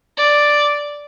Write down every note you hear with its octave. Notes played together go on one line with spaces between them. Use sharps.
D5